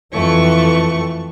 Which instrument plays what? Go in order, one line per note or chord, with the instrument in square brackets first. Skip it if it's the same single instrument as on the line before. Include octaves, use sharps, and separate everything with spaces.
[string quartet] F2 A3 C#6 [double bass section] E3